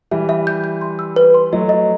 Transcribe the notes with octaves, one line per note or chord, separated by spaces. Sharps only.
E3 G3 E5
E5
G6
G6
C6
E6
B4
C6
F#3 A3 D#5
D#5